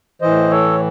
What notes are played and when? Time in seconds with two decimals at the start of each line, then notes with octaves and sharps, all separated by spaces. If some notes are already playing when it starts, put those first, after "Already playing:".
0.21 A2 E3 C5 D#5
0.50 A4 C#5